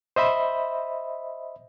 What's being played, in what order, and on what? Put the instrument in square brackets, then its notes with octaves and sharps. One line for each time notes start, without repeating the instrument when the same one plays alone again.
[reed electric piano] C5 D#5 E5 B5